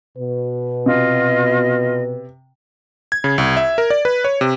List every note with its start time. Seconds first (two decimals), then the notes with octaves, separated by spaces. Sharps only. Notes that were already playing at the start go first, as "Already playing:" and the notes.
0.18 B2 B4
0.86 C3 F4 D#5
3.12 G#6
3.24 C#3
3.38 C2
3.57 E5
3.78 A#4
3.90 D5
4.05 B4
4.24 C#5
4.41 C3